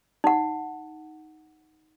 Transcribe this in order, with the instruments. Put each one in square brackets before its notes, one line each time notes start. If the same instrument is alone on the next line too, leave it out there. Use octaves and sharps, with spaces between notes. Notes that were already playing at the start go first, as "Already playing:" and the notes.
[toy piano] D#4 F#5